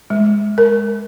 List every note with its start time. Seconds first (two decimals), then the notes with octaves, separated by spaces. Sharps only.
0.10 G#3
0.58 A#4